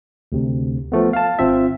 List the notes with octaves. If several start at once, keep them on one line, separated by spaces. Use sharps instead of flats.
D2 C3
F3 A3 B3
F5 A5
G#1 C4 F4 E5